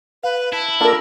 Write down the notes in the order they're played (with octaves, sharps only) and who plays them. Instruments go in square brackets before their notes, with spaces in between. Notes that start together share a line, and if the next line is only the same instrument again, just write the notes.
[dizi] B4 [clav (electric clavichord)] F5
[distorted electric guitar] E4 [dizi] A5
[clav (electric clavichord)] A#3 D4 A4 [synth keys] F4 A#4 [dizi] E6